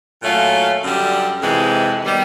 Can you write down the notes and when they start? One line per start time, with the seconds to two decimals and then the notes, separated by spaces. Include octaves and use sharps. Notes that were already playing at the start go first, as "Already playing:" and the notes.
0.22 A#2 F#3 A3 C#4 F4
0.82 F#2 D3 G3
1.42 F2 C3 E3 G#3
2.05 D#3 G3 B3